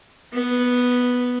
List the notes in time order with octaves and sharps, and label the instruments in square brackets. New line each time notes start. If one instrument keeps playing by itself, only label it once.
[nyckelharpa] B3